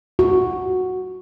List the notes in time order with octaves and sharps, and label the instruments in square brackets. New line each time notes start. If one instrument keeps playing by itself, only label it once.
[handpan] F#4